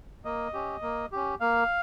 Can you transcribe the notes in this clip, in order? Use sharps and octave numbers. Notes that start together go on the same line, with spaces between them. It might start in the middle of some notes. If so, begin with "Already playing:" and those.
A#3 D#5
C#4 G4
A#3
C#4 G4
A#3 F5